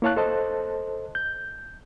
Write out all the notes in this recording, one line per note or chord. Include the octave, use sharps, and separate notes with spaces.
A#3 E4 C#5 F5 A5 F#6
A4 C5 D#5 A5
G6